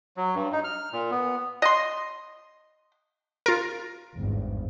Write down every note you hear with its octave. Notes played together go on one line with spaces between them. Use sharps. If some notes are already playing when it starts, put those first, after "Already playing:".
F#3
G2
D#4
F6
A#2
B3
D#5 C6
F4 A#4
G#1 E2 G2